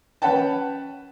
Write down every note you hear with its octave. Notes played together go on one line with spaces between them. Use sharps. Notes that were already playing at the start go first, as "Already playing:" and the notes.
C#4 B4 C#5 F#5 G5 A5